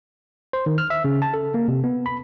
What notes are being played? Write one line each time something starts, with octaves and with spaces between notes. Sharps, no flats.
C5
D#3
F6
E5
C#3
A5
A4
A#3
C3
B3
B5